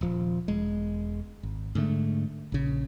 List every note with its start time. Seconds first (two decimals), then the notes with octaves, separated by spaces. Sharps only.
0.01 D#1 F3
0.48 E1 G#3
1.43 G#1
1.75 G#2 D3 A3
2.52 A#1 C#3